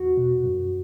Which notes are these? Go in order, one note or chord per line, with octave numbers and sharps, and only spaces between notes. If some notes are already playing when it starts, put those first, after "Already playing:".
Already playing: E2 F#4
B2
F#2